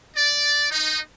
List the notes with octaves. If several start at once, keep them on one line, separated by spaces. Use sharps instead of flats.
D5
D#4